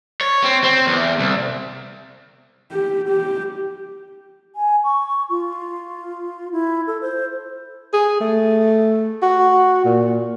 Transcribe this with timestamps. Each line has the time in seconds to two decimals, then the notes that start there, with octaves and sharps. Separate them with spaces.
0.21 C#5
0.44 C4
0.64 C4
0.87 E2
1.19 C2
2.72 G4
3.09 G4
4.55 G#5
4.84 C#6
5.30 F4
6.52 E4
6.87 A4
7.01 C5
7.93 G#4
8.21 A3
9.22 F#4
9.85 A#2